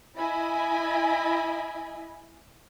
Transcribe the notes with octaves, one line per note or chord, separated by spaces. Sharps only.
E4 D#5 G#5 B5